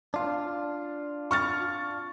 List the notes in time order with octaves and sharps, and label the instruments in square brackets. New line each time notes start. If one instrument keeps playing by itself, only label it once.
[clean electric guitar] D4 F4
[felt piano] C#6 F6 A6